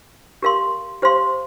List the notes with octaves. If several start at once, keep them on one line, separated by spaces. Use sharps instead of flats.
G4 A#4 F5 C6
G4 C5 F5 C6